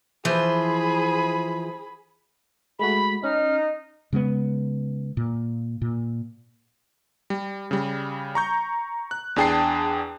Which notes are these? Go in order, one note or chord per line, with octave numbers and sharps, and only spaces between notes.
E3 F3 G#4 C5 B5
G#3 A3 F#4 B5
C#4 D#4 F6
C#3 G#3 A#3 B3
A#2
A#2
G3
C#3 G3
A#5 C#6 G6
F#6
E2 D4 G#4 G5 A5 C7